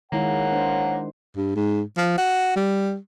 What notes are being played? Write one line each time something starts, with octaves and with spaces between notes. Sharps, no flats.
D#3 G#3 A#3 E4 C#5 F#5
D4 C5
G2
G#2
F3
F#4
G3